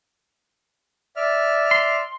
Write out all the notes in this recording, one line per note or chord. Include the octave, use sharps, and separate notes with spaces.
D5 E5 F6
C6